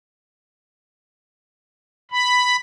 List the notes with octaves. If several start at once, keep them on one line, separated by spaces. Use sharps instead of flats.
B5